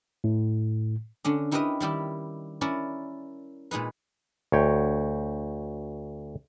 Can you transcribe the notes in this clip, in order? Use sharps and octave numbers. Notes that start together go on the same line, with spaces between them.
A2
D3 C#4 D4
D#4 E4 G4 A#4 B4 D#5
D#3 G3 E4 G4
C#4 E4 A#4 D5
A#2 G#3 D#4 B4
D2 C#5 G5